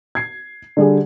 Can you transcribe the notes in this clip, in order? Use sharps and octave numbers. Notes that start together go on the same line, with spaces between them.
G#6 C7
D3 G3 G#4